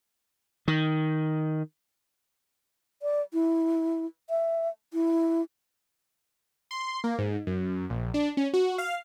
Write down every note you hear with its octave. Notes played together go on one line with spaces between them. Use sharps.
D#3
D5
E4
E5
E4
C6
A#3
G#2
F#2
A#1
D4
C#4
F#4
F5